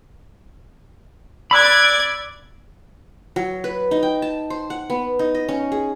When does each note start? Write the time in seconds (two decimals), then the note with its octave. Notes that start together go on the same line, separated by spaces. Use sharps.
1.51 D5 B5 E6 F#6 G#6
3.36 F#3
3.64 B4
3.91 D#4
4.03 G5
4.22 A5
4.50 C5
4.70 F#5
4.90 B3
5.19 D#4
5.35 D#5
5.49 C#4
5.72 G#4